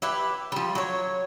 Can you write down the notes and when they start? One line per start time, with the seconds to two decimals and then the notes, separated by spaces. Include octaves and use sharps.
0.02 E4 G4 B4
0.52 F3 G3
0.75 F#3 C#5